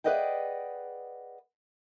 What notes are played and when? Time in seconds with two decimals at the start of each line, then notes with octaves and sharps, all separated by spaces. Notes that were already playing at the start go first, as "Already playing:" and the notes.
0.04 G#4 B4 D5 D#5 F#5 G5